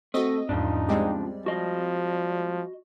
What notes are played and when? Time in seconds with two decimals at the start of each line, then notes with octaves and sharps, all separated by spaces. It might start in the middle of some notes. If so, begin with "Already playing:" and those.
0.14 A3 C4 F#4 D#5
0.49 E2 G#2 C#3 F3 D4 D#4
0.89 G3 G#3 C4 D5
1.46 F3 F#4 D#5